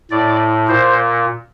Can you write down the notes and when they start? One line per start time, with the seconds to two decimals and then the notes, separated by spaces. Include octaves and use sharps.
0.11 A2 D5
0.68 A#2 C5